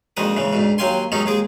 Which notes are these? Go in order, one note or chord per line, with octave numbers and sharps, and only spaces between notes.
A#1 F2 D#3 G#3 F#4 D#6
G#2 C#3 E3
D2 G#2 B2
D#2 F#3 G4 F5 G#5 C6
G#2 D#3 F#3 B3 C#4 D#4
D#2 G#3 G#4 D6